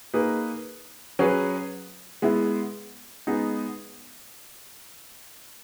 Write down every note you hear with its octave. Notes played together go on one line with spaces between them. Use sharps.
A#3 D#4 G#4 B4
F#3 C#4 G#4 B4
G#3 B3 E4
G#3 B3 D#4 G#4